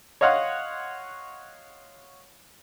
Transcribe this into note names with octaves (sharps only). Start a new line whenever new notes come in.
C#5 D#5 F5 F#5 C6